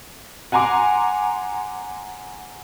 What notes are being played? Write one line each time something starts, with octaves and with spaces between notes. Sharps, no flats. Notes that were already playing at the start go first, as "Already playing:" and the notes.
F#5 G#5 A#5 C6 D6